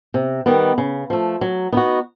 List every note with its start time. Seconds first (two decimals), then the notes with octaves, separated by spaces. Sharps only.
0.14 C3
0.46 D#3 G3 B3
0.78 C#3
1.10 F3 A3
1.41 F#3
1.72 B3 D#4 F#4